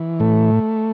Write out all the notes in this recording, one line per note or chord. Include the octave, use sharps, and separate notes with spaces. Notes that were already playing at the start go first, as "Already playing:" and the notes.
Already playing: E3
A2 A3